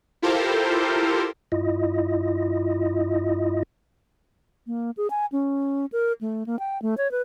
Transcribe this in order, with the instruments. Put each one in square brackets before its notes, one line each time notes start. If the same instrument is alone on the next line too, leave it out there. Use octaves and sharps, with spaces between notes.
[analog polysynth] E4 F4 G4 A4 A#4 C5
[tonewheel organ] G2 E4 F4 D#5
[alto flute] A#3
G#4
G#5
C#4
A#4
A3
A#3
G5
A3
C#5
B4